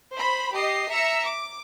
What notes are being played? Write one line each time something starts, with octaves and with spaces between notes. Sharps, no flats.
C5 B5
G4 D#5 C7
E5 A#5 E6 C#7
D6